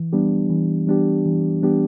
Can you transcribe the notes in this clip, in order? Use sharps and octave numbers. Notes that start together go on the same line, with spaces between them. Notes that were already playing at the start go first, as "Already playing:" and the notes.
Already playing: E3
G3 B3 D4 G4
E3
G3 B3 D4 G4
E3
G3 B3 D4 G4